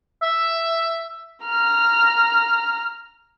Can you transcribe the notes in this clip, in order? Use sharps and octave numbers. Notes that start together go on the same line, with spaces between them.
E5
A#5 F6